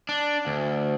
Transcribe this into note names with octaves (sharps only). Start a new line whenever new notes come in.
D4
D2